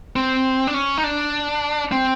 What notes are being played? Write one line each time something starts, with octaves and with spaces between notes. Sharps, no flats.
C4
D4
C#4
D#4
D4
C4